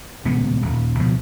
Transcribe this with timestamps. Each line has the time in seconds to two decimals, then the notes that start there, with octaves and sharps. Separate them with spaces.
0.25 D#1 C#2 B2 B3
0.62 D#1
0.99 C#2 B2 F3